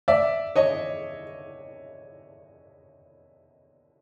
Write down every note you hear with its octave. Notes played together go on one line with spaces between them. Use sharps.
D5 E5
C#5 D#5